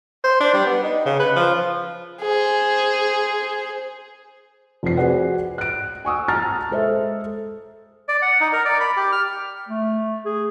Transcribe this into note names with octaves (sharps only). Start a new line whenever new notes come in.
C5
D4
G3
B3
D#4
C#3
B4
F3
G#4 C5
F1 F3 C5 C7
F#4 G#4 B4 C5 D5 F#5
F#6 D7
G#5 C#6 D#6 E6
A5 A#5 D#6 F6 A6
G#3 A4 C5 E5
D5
F#5
D#4
A#4
D5
B5
G4
F6
A3
G#4